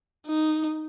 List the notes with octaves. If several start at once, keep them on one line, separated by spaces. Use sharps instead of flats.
D#4